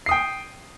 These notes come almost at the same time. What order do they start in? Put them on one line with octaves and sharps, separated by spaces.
C7 D#6 G5